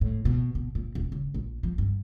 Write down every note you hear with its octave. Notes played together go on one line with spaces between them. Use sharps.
A2
B2
B2
A#2
D#1
F#1
A#1
F3
G2